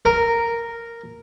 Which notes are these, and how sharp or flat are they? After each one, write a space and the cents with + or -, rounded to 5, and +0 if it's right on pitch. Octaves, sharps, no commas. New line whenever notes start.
A#4 -5